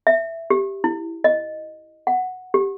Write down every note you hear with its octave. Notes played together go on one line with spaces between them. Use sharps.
E5
G4
E4
D#5
F#5
G4